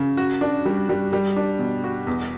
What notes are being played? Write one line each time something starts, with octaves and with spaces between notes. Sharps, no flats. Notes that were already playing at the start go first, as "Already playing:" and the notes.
Already playing: C#3
F#4
D4
G3
G3
G3
D4
B2
F#4
E2